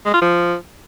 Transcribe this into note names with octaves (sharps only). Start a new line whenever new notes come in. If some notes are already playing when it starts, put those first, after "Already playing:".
G#3
F4
F3